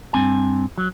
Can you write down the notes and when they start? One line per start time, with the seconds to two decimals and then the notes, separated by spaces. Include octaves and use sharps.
0.13 G2 C4 G#5
0.78 F#3